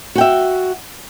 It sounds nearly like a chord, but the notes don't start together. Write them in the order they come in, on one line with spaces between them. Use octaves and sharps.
F#4 G5 E5